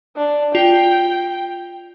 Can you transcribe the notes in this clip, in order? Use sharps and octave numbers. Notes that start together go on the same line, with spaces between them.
D4
F4 G5